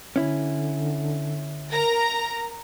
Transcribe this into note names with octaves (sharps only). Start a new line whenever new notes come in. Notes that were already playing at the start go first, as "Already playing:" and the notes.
D3 C#4 E4
A#4 A#5